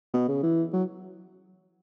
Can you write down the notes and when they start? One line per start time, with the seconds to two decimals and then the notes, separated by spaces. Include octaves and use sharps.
0.14 B2
0.28 C#3
0.43 E3
0.73 F#3